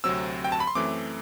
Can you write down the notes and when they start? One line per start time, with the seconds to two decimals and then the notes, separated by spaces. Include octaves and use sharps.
0.04 D2 C3 F#3 C4 E6
0.44 G5
0.52 A5
0.60 B5
0.67 C6
0.75 F#2 E3 A3 C4 D6